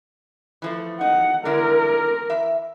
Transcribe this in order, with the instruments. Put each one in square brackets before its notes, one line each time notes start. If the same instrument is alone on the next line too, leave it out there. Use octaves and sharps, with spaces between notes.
[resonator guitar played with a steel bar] E3 F3 A3
[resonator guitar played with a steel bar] D#4 [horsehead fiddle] F#5
[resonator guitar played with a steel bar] D3 G#3 E4 [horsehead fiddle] A#4
[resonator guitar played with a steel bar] E3 E5